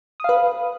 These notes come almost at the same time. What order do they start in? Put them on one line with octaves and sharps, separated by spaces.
D#6 F5 B4